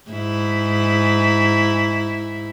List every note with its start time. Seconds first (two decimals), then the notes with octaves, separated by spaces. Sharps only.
0.11 G#2 E4